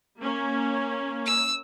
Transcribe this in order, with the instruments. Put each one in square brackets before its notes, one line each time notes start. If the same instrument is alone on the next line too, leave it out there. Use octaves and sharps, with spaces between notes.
[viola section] A#3 C#4
[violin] E6